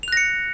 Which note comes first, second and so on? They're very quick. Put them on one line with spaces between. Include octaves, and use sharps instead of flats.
F7 F#6 A#6 C#7